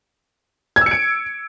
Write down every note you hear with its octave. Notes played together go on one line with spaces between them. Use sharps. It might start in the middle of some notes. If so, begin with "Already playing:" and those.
G#6
E6
C#7
D7